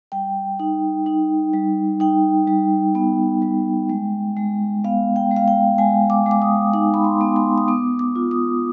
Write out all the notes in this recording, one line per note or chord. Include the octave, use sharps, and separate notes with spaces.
G3 G5
D#4
D#4
G3
D#4 G5
G3
B3
G3
G#3
G#3
B3 F5
G5
G#3
F5
G5
G#3 G#5
D6
G#3 D6
D#6
D#4 D6
B5
C6
B3
C6
D#6
B3 D6
D6
F4
D#6